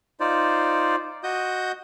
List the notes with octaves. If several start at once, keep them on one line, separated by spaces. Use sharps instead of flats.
D#4 F4 C5 D5
F#4 D#5 D#6 G6